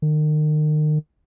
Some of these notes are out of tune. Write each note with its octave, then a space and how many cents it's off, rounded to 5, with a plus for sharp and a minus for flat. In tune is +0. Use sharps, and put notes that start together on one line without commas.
D#3 -35